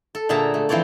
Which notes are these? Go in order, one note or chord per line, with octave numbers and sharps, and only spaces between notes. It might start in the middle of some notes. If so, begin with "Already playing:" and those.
A4
A#2 D3 G#4 E5 A5 A#5
A3
E3 F3 C4 C#5 D5